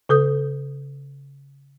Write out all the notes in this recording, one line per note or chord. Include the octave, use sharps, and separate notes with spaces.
C#3 A4 D#6 G6